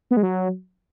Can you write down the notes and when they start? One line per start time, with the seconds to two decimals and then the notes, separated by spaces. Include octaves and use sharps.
0.11 B3
0.17 G#3
0.23 F#3